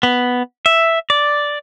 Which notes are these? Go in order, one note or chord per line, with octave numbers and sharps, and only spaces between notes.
B3
E5
D5